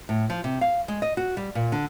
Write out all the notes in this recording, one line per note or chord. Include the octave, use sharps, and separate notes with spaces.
A2
F3
C3
F5
G#3
D#5
F#4
G3
A#2
D3